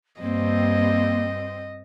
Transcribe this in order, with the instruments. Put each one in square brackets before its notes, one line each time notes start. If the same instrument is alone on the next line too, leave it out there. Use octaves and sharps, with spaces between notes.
[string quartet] G2 [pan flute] A#3 [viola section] C4 [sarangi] D#5